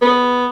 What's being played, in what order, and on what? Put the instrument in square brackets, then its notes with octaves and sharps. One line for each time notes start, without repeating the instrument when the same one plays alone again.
[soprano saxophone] B3